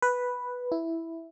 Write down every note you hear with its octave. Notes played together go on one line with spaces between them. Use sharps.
B4
E4